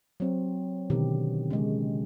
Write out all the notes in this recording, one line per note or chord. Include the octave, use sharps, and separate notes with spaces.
F#3 C4
B2 D3 D#3 G4
C#3 G#3